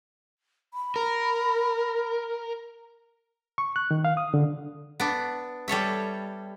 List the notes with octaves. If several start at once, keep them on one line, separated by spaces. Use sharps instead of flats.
B5
A#4
C#6
F#6
D#3
F5
D#6
D3
B3 D4
G3 A4 C#5 E5